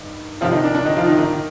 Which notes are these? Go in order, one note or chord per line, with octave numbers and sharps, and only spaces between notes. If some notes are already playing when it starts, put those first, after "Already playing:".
Already playing: G2 D#3
C2 C3 D#3 F3 F4
D#3 D#4
D4
D4
D#3 D#4
F3 F4
D#3 D#4
D#3 D#4
D#3